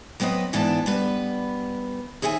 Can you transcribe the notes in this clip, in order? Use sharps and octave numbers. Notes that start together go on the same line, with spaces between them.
F#3 B3 C4 B4 D#5
G#2 E3 B3 D4 A5
G3 B3 B4
D#2 G#4 E5 F#5 G#5